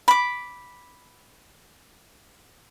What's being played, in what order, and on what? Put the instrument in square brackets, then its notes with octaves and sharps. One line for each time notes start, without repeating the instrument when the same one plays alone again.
[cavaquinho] B5 D6